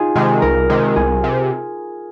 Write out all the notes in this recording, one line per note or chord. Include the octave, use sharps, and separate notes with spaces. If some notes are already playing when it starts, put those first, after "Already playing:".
Already playing: D#4 F4 G#4
C3 D#3 G#3
C2 A#4
C3 D#3 G#3
C2 G#4
C3